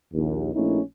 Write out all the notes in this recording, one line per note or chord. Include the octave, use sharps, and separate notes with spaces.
A#1 D#2
A#1 A3 A#3 C#4 D#4 E4